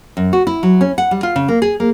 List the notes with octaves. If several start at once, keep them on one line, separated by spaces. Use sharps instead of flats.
F#2
F#4
E4
F#3
C#4
F#5
G3
F4
C#3
A#3
G#4
A#3